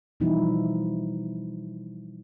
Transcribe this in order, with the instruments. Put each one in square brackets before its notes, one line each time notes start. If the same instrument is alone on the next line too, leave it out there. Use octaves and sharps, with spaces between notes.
[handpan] B2 E3 F3 G3 D#4 E4